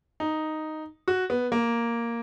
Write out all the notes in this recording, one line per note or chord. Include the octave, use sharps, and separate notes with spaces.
D#4
F#4
B3
A#3